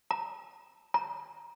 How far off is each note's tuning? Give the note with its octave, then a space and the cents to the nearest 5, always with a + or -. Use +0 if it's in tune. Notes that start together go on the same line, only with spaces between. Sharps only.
A#5 -10
A#5 +20